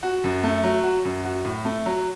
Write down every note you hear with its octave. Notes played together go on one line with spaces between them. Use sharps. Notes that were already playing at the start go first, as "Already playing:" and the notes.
F#4
F#2
A3
F#3
F#4
F#2
F#4
A2
A3
F#3